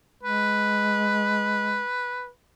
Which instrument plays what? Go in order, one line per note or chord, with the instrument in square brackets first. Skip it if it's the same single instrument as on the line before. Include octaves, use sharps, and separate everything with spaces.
[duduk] G#3 [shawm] B4